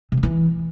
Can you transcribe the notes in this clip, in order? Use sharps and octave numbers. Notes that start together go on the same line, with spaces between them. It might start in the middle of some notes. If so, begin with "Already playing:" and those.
C3
G2
E3